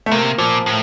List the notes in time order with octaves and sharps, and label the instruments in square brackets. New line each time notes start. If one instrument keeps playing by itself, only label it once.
[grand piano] A3
[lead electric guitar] C3 [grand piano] A#3
[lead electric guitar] A#2 [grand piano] F3
[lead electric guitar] A2